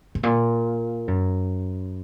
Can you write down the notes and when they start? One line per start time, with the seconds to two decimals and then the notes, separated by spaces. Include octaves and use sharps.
0.15 G#2
0.23 A#2
1.08 F#2